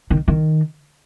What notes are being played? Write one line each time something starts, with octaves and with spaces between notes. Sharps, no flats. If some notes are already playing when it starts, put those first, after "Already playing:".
D#3
D#3